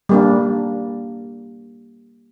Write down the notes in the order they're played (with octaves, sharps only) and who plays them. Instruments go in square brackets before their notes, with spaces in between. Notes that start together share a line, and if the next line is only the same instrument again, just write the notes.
[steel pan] G3 A#3 D4